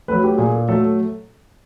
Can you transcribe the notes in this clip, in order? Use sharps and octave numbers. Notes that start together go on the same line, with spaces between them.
F#3 A3 B4
G4
A#2 G#4
A4
F#3 A3 A4